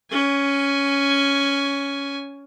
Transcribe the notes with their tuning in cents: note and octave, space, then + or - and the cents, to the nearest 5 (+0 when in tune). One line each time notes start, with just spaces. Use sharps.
C#4 +10 G#5 +0